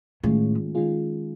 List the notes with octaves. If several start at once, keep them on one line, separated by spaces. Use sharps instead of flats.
A2 D#3 G#3 C#4 F4 G#4
D#3 G#3 C#4 F4 G#4